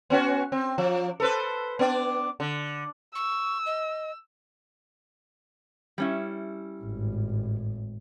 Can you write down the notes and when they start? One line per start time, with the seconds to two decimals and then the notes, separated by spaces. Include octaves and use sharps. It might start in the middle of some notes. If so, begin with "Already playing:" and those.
0.10 B3 C#4 F#4
0.52 C4
0.78 F3
1.20 A4 B4 C5
1.79 B3 D4 D5
2.40 D3
3.15 C#6 E6
3.66 D#5
5.98 G3 C#4 E4
6.81 G#1 A2